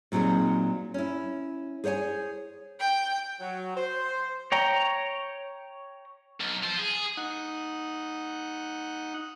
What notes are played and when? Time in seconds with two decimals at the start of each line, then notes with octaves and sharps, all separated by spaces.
0.12 A#2 F#3 C4 D#4 G#4
0.94 C#4 E4
1.84 G#4 C5 C#5 F#5 G#5
2.80 G5
3.40 F#3
3.76 C5
4.52 C#5 G5 A#5
6.41 B1
6.64 F4 C5
6.79 G#4
7.17 D#4 F#5